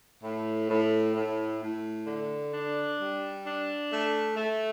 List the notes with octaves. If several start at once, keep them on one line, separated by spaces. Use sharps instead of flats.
A2
A2
A2
A2
D3
D4
G3
D4
A3
A3